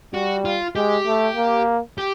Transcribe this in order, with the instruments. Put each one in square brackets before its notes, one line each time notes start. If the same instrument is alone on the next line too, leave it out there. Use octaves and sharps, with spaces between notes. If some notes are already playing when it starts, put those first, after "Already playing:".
[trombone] G3 [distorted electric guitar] F#4
[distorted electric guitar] F4
[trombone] G#3 [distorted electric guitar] G4
[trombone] A3
A#3
[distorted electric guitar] G4